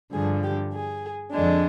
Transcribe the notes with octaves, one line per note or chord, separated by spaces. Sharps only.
G2 D3 F3 G#4
G4
G#4
F2 D3 G#3 D4